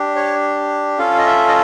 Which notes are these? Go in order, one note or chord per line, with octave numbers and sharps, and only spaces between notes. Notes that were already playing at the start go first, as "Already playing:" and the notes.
Already playing: D4 G4
C#5
C#4 F4 A4 F5
D#5
E5
D#5